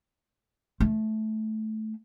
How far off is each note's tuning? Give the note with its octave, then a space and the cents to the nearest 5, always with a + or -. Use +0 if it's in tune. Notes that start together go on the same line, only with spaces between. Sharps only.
A3 -15